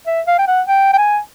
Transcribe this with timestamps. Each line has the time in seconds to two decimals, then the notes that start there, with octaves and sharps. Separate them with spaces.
0.07 E5
0.27 F5
0.39 G5
0.47 F#5
0.68 G5
0.93 G5
0.98 G#5